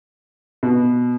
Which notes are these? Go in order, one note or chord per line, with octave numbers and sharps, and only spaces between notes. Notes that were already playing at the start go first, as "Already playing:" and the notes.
B2